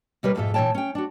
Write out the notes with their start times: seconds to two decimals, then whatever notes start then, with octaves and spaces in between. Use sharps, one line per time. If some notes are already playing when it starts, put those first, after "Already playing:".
0.23 D2 B2 G3 A#4 B4 C#5
0.35 F2 G#2 B2 F4 A4 E5
0.54 A#2 E3 A3 C#5 G5 A5
0.75 C#4 G5
0.95 D4 F#4